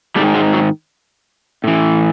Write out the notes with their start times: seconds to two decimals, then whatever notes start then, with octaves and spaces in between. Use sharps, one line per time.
0.16 G#2 G3 A3
0.19 D#3
0.34 F#3 G#3
0.53 F#3
1.64 A2 E3